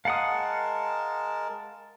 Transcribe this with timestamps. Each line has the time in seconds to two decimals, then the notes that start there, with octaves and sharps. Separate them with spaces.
0.05 G#3 A#4 F5 F#5 A5 D#6